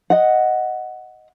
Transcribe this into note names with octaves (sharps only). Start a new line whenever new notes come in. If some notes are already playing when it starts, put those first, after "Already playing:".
D#5 F#5